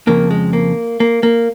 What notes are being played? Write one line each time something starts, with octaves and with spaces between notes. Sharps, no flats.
F2 C#3 F3 A#3
G#3
A#3
A#3
A#3